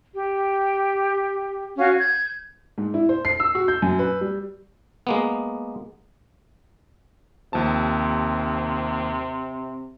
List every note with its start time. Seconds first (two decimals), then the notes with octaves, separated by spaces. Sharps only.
0.14 G4
1.77 C#4 F#4 C#5 F5
1.98 G6 G#6
2.78 G#2
2.94 E4
3.09 C5
3.25 C7
3.40 E6
3.55 F#4
3.68 G6
3.82 F#2
3.99 B4
4.21 G3
5.07 G#3 A#3 B3
7.53 D#2 C3 F3 A5